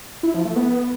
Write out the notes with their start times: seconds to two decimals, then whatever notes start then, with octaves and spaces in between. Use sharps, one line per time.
0.23 E4
0.34 F3
0.45 A3
0.56 B3